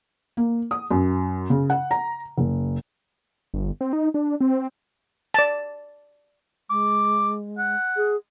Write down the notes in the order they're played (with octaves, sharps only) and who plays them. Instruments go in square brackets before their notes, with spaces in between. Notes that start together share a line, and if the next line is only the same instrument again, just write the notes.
[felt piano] A#3
D#6
F#2
C#3
F#5
A#5
F#1
[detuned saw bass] G1
C4
D#4
D4
C4
[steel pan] D5 A5
[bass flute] G#3 [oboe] D6
[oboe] F#5
[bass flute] G#4